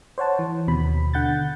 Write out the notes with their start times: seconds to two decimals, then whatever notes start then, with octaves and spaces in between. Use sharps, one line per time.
0.18 C5 C#5 F#5 A5
0.39 E3
0.68 D#2 B2 B5
1.14 D3 F#5 G6 A6